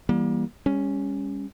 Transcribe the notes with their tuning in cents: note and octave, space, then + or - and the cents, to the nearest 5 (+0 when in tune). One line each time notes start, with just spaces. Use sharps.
E3 +0 G3 +0 A#3 +40
G3 +40 C#4 +0